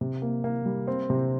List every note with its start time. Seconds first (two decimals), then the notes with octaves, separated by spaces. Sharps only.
0.01 C3
0.22 A#3
0.44 A#3
0.65 G3
0.88 C4
1.10 C3